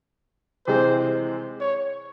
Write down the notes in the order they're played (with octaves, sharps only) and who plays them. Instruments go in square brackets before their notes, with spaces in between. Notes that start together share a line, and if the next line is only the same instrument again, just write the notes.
[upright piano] C3 E3 G#3 C4 [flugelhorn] C5
[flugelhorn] C#5